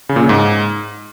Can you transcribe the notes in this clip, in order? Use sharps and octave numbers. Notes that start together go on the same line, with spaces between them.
C#3
A#2
C#3
G#2